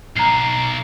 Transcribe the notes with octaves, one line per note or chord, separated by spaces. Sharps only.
B1 A#5 C7